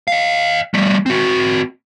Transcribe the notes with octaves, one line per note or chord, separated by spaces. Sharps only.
D#5 F5
G3 A3
C4 F#4